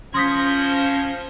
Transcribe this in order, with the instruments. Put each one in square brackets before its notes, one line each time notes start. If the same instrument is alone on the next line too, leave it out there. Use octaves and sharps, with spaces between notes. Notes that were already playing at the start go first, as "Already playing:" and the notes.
[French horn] F3 [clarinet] C#4 [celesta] C6 D#6 B6 [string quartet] G6 G#6 A#6